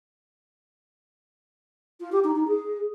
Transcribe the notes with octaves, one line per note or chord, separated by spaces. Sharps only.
F4
G4
D#4
D#4
G#4